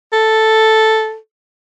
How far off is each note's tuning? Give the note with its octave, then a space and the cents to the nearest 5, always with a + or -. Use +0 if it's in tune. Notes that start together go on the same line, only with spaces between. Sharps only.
A4 +0